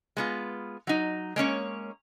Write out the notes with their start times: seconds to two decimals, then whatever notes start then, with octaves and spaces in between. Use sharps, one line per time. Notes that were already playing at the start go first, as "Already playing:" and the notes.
0.17 G#3 B3 F4
0.87 F#3 D#4
1.36 G#3 A#3 C#4 C#5